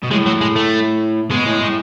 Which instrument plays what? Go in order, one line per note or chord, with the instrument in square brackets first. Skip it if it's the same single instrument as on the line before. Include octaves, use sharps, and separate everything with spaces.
[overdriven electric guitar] B2
[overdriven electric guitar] A2 [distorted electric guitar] G#3
[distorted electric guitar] F#3
G#3
A3
[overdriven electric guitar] B2 [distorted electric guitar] G#3
[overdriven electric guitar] A2
A2